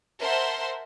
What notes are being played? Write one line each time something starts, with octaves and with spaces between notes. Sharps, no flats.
A#4 C5 E5 F#5 A5 C6